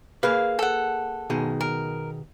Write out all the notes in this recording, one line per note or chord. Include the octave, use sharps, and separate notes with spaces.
A#3 G#4 B4 F5
A4 F#5
B2 D#3 G#4
A#4